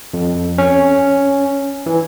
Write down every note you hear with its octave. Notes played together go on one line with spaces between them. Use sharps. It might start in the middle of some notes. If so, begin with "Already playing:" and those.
F2
C#4
E3